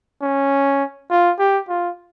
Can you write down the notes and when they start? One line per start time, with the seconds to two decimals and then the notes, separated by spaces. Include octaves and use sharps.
0.22 C#4
1.11 F4
1.39 G4
1.69 F4